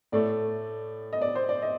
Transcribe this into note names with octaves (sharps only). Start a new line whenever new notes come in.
A2 A3 D5
D#5
D5
C5
D5
D#5